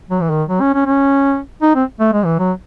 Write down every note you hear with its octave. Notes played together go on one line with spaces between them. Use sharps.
F#3
E3
D#3
F#3
C#4
C#4
C#4
D#4
C4
A3
G#3
E3
F#3